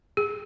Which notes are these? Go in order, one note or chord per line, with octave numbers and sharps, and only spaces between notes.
G#4